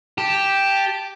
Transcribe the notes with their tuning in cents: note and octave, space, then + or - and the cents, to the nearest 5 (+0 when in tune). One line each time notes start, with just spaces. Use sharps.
G4 +0 A5 +0